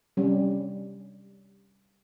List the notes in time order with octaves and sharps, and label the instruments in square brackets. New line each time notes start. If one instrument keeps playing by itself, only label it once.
[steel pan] G3 C#4